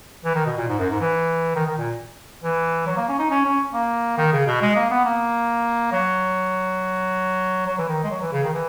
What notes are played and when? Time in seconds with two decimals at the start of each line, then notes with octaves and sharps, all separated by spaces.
0.25 E3
0.35 D#3
0.46 B2
0.57 A#2
0.68 G#2
0.79 F#2
0.90 G#2
1.00 E3
1.55 D#3
1.66 D#3
1.78 A#2
2.43 E3
2.87 F#3
2.97 A#3
3.08 C#4
3.19 D#4
3.30 C#4
3.45 C#4
3.74 A#3
4.18 D#3
4.33 C#3
4.47 B2
4.61 G#3
4.76 A#3
4.91 B3
5.05 A#3
5.92 F#3
7.67 F#3
7.78 E3
7.89 D#3
8.04 G#3
8.11 F#3
8.21 E3
8.32 C#3
8.44 D#3
8.54 E3